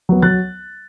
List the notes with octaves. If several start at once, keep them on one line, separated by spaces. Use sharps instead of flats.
F#3 B3
F#3 F#6 A6